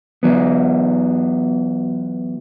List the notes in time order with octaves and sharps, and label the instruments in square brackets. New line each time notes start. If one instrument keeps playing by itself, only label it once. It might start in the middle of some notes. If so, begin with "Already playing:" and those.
[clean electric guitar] E3 F#3 B3